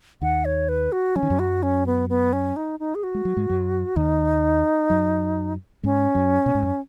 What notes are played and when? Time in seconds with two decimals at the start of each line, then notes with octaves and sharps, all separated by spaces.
0.21 D#2 D#3 F#5
0.45 C#5
0.69 B4
0.92 F#4
1.16 F#3 C#4
1.23 D#3
1.30 F#2 F#3
1.39 F#4
1.63 C#4
1.86 B3
2.09 B3
2.33 C#4
2.56 D#4
2.80 D#4
2.95 G#4
3.03 F#4
3.15 G#3
3.25 F#3
3.36 G#2 G#3
3.49 F#2 F#3
3.96 D#2 D#3 D#4
4.90 F#2 F#3
5.83 G#2 G#3 C#4
6.15 F#2 F#3
6.46 B2
6.55 G#2
6.63 F#2